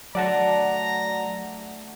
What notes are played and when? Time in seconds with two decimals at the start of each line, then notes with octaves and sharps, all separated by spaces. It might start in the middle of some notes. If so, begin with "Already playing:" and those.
0.15 F#3 A3 D4 F#4 D5 F#5 A5 A#5